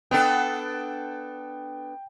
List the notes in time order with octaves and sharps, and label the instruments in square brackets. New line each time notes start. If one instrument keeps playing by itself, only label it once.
[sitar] B3 D4 A4 [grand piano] G5